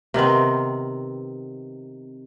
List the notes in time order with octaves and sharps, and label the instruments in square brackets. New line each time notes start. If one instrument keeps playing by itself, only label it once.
[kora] C3 D#3 B3 C4